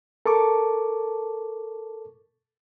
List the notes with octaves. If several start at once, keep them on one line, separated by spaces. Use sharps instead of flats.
A4 A#4 A5 C#6 D6